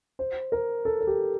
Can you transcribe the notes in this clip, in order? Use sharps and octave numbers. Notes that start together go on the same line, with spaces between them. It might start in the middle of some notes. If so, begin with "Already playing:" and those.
C5
A#4
A4
A4
G4